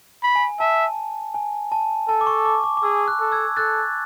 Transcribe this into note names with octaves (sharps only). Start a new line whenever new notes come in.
B5
G#5
E5 A5
G#5
A5
A4 A5
D6
C#6
D6
D6
D6
G#4 E6
F#6
A4
E6 G#6
A4 F#6 A6